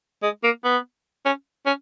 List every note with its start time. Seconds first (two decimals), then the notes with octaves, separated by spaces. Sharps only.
0.23 G#3
0.44 A#3
0.65 B3
1.25 C#4
1.66 C#4